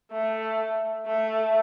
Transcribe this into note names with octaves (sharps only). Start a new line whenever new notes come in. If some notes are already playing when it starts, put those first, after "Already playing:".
A3
A3